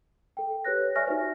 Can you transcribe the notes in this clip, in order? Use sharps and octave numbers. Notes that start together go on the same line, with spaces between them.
A4 G5
G4 B4 C#5 F#6 A#6
C#5
D5 E5 G#5 C#6 F6 A#6
D#4 F4 F#4 C5
F#4